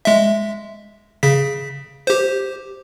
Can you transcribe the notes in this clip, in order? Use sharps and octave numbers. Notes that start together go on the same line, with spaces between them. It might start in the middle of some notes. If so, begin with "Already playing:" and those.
G#3 E5
C#3 B6
G4 C5